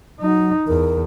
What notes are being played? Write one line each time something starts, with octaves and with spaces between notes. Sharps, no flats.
F#3 D#4
E2 A#4